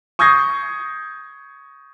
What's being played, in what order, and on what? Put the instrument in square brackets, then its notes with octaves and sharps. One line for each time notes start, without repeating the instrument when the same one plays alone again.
[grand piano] C#6 D#6 G6 G#6 A#6 C7